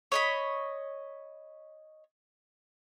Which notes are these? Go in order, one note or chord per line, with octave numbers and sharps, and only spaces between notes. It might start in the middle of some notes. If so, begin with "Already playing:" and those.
C#5 D#5 B5